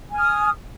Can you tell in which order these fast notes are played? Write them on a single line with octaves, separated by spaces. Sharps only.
G#5 F6 D#6